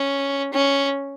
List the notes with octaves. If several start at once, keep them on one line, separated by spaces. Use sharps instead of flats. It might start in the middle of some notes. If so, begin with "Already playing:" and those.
Already playing: C#4
C#4